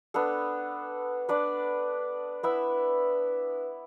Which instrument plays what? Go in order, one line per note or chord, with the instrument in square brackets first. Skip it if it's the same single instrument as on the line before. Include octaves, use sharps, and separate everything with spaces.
[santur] B3 D4 A4
D4 B4 D5
B3 E4 B4 E5